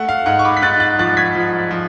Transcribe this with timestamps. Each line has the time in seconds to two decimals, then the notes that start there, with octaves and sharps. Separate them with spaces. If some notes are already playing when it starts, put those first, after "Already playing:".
Already playing: A3 F#5
0.09 F5
0.26 G#2 F#5
0.39 C#6
0.45 B5 D6
0.57 B6
0.62 G#2 F#6 A6
0.80 F#6 A6
0.99 F3 F#6 A6
1.17 G#6 B6
1.35 F3
1.71 F3